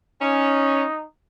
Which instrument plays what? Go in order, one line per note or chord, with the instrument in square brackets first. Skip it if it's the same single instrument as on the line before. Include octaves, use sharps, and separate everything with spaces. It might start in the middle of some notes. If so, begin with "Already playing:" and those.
[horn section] C#4 [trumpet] D#4